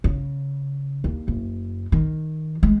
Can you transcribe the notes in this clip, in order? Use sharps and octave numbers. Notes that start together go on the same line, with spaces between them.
C#3
D#2
F#1
D#3
G#3